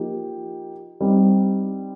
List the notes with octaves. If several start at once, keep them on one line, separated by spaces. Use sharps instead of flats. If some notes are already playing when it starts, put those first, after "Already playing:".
Already playing: F3 A#3 D#4 G4
G3 C4 D#4